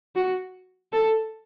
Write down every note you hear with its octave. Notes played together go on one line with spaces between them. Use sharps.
F#4
A4